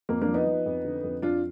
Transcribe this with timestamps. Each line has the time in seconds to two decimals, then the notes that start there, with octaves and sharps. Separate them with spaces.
0.09 F2 A#3
0.22 A#3 D4
0.28 F3
0.34 B3 D#4
0.47 F3
0.66 F2
0.84 D3
1.04 F2
1.22 F2 D4 F4